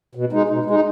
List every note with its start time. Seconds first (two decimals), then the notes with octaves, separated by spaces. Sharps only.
0.15 B2
0.32 G#3 D#4
0.49 B2
0.66 G#3 D#4